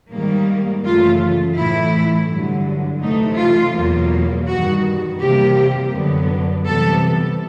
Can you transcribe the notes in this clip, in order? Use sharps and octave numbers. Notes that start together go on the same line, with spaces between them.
G#2 D#3 G3 A#3
F#2 C#3 E3 A3 F4
A2 E3 A3 E4
G2 D3 F#3
C3 E3 A3 D#4
F4
E2 B2 F#3 A#3
G2 D#3 G3 F#4
C3 E3 G3 A#3 G4
F#2 D3 F#3 B3
C3 E3 G3 B3 A4